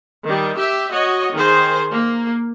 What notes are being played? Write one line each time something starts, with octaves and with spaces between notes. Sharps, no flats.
D#3 G3
G4 E5
F#4 C#5 D#5
D#3 G#4 C5
A#3